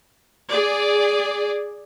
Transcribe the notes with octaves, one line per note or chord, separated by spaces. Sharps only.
G#4 D5